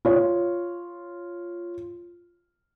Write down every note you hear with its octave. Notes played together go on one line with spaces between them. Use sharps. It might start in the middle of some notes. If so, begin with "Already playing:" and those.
F4 C#5